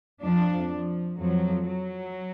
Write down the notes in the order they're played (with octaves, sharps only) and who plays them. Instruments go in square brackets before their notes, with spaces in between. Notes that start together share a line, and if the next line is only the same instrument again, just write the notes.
[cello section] F2 F3 D4
F3
F2 F3 F#3
F#3